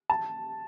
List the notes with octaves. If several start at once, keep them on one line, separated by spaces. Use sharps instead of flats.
A5